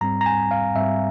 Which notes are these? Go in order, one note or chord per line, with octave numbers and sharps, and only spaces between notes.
G#2 G3 C4 A#5
A#5
G#5
F5
G#2 G3 C4 E5